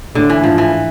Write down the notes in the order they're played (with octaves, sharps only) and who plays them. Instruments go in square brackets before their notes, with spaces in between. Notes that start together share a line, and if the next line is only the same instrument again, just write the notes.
[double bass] A2 [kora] D3
[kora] E3
[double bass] G#2 [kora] F3
[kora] E3